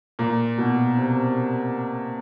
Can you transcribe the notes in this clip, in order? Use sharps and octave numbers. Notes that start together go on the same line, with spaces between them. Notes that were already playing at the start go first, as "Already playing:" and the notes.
A#2
B2
C3